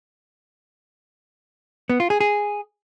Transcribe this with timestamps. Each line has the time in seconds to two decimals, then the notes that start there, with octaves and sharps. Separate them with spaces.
1.90 B3
2.00 F4
2.10 G#4
2.21 G#4